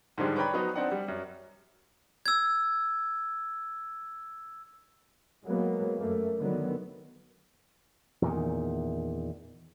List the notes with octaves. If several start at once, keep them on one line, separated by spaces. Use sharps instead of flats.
G#2 D3 D#3 F3 G3 G#3
B4 C#5 D5 G5 A#5 B5
F3 F#3 B3 D#4
C4 D4 D#4 D5 F#5
G3
F#2
E6 G#6
F#3 G#3 A#3 B3
F#2 A3 A#3
D3 D#3 F#3 B3
E2 A#2 D#3